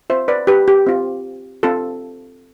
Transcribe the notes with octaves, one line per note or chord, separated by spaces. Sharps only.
C4 F4 C5 E5
B4 D5
G4 B4
G4
C4 F4
C4 F4 A4